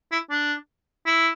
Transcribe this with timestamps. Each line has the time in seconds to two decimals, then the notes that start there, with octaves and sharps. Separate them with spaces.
0.12 E4
0.30 D4
1.06 E4